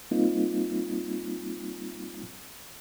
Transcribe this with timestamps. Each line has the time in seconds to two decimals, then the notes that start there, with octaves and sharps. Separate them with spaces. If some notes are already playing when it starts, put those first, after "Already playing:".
0.11 G3 A#3 C4 D#4 F4